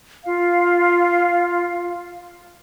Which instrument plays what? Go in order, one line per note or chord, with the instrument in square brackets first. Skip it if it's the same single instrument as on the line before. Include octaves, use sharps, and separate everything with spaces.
[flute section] F4 F5